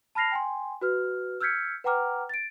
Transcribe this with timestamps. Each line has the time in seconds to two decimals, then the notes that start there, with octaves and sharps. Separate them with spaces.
0.15 A5 B5 F6 A#6 C7 F7
0.32 G5 G#5 C6
0.81 F#4 B4 F6
1.41 E6 F6 G6 G#6 B6 C#7
1.84 B4 F#5 G5 A#5 D6 F6
2.29 A6 D7